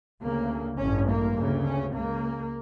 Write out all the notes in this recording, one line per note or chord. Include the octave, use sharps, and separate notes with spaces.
D2 C#3 A#3
A1 G2 C#4
A#3
D2 C#3
C#4
C#2 C#3 A#3